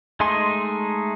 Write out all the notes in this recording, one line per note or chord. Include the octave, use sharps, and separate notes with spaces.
G#3 A3 D#4 G#4 C6